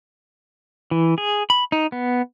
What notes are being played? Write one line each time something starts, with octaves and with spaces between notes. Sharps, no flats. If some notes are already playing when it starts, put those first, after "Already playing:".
E3
G#4
B5
D#4
B3